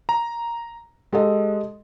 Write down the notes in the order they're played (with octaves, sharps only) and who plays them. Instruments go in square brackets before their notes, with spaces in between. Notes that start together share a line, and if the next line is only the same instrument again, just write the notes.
[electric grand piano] A#5
[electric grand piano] G#3 [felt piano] G4 A4 D#5